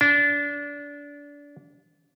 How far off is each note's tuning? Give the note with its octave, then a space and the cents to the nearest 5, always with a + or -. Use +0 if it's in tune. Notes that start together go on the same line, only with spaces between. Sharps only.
D4 -25